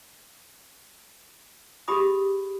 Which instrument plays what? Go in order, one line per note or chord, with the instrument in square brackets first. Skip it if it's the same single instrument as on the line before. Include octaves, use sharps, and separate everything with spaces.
[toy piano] G4 G#4 B5 D#6